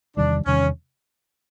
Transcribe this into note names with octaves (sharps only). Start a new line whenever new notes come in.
E2 C3 D#3 G3 D4
E2 C3 D#3 G3 C#4